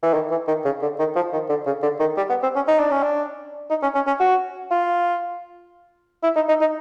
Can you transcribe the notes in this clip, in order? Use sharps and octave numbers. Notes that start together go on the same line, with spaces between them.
E3
D#3
E3
D#3
C#3
D3
D#3
F3
D#3
D3
C#3
D3
D#3
G3
B3
C4
C#4
D#4
D4
C#4
D4
D#4
C#4
C#4
C#4
F#4
F4
E4
D#4
D#4
D#4